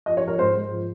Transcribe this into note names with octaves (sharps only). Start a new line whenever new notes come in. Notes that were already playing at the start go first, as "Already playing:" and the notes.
F3 D#5
C#5
F3 A#4
G#2 C5
G#2
F3